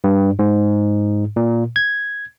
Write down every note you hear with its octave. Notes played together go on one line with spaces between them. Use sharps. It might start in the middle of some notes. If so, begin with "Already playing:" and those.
G2
G#2
A#2
G#6